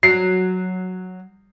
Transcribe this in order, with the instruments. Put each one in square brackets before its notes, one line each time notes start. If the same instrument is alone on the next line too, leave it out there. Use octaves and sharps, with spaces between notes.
[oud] F#3 [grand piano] C7